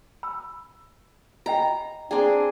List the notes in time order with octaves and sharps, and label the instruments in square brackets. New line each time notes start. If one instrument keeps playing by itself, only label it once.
[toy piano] B5 E6
[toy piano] F4 D#5 G5 [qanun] A#5
[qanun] C4 G#4 [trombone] D4 [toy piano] G5 A#5 C6